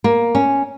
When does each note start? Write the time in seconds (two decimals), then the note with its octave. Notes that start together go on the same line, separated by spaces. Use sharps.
0.04 A#3
0.35 C#4